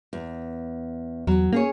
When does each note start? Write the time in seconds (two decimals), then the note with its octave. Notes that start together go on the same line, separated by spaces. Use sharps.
0.13 E2
1.27 E2 F#3
1.53 A#3 C#4 G#4 C#5